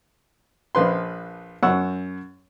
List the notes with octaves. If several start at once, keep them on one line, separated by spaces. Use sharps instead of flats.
A#1 F3 B4 C6
F#2 F#5 C#6 E6